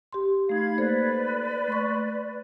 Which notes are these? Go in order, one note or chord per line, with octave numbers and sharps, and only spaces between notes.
G4 C6
A3 D#4 F5 B5 G#6
A#3 A4 B4 C5 D5
A3 C6 C#6